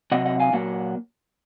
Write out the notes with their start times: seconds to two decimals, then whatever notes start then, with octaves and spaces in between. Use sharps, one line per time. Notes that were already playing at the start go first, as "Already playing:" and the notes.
0.12 C3 F#3 C4 D#5 F#5
0.25 D#5 F#5
0.40 F5 G#5
0.53 A#2 F#3 A#3 F#5